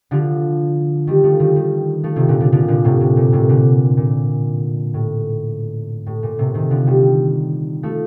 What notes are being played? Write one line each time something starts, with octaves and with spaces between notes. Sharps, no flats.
D3 F3
D#3 G3
F3 A3
D#3 G3
D#3 G3
F3 A3
C3 D#3
A#2 D3
D3 F3
D3 F3
A#2 D3
A2 C3
A2
A#2
A2 C3
A#2 D3
A#2
A2
A2
A#2
A2 C3
C3 D#3
D3 F3
D#3 G3
F3 A3